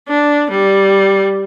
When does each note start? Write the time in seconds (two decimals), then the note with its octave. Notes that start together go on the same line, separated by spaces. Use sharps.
0.08 D4
0.50 G3